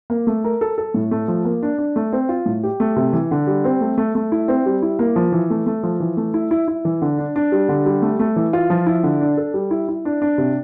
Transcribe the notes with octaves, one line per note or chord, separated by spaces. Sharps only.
A#3
A3
A#4
A4
A4
A2
A3
F3
A#3
D4
D4
A3
C4
F4
A2
G4
A3
C3
E3
D3
G3
C4
A3
A3
A3
E4
C4
G3
E4
A#3
F3
E3
A3
A3
F3
E3
A3
E4
E4
E4
E3
D3
D4
D4
G3
D3
G3
A3
A3
E3
F4
F3
E4
D3
D4
A4
G3
E4
E4
D4
D4
C3